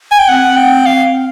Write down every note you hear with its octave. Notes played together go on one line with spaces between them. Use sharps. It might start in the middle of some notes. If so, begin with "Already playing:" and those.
G#5
G5
C4 F#5
G5
F5